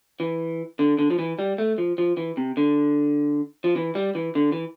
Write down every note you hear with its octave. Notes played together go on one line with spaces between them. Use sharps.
E3
D3
D3
F3
E3
G3
A3
F3
F3
E3
C3
D3
F3
E3
G3
E3
D3
E3